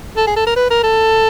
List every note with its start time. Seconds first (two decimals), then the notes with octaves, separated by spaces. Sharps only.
0.17 A4
0.27 G#4
0.36 A4
0.47 A#4
0.56 B4
0.70 A#4
0.83 A4